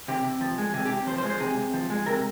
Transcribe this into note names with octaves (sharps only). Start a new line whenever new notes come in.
C3 G4
C3
F3
G#3
C3 G#4
G4
C3
F3 C5
C5
G#3
C5
C3 G#4
C3
F3
G#3
C3 A#4